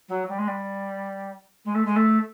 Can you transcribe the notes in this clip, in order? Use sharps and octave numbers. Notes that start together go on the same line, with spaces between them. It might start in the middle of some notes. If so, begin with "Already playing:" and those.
F#3
G3
G#3
G3
G#3
A3
G#3
A3